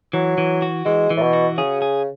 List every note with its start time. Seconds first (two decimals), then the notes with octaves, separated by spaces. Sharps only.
0.13 E3 F#3
0.38 E3
0.62 F#4
0.85 E3 G#3
1.10 E3
1.17 A2
1.22 B2
1.33 F#4
1.58 C#3 G#4
1.82 G#4